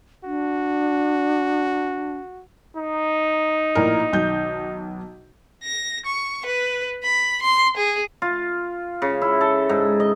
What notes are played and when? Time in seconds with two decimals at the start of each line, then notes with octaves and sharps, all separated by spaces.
0.25 D4 F#4
2.77 D#4
3.75 A#1 A2 A#4
4.13 B1 D#3 G6
5.63 A#6
6.06 C#6
6.46 B4
7.04 B5
7.43 C6
7.77 G#4
8.22 F4
9.02 C#3
9.22 E4
9.41 A4
9.69 G#2
10.00 D#5